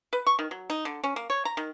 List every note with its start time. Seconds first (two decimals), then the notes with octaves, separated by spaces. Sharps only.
0.13 B4
0.27 C#6
0.39 D#3
0.51 F#3
0.70 D#4
0.85 D3
1.04 C#4
1.16 A#3
1.30 C#5
1.45 A#5
1.57 D#3